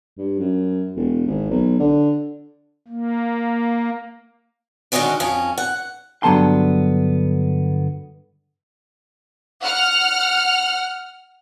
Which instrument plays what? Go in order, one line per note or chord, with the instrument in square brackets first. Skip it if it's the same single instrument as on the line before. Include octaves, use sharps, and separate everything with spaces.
[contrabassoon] G2
F#2
E1
G#1
B1
D3
[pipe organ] A#3
[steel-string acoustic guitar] D3 D#3 F3 G#3 C#4 F#4
F2 C#4
F#5
[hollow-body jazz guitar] G2 D3 F#3 B3 A5 C6
[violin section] F#5 F6